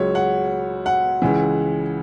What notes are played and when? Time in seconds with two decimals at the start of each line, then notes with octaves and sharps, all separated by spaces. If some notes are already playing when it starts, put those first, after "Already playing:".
Already playing: C#2 C#3 F#3 C#5
0.15 F#5
0.86 F#5
1.22 C#2 C#3 E3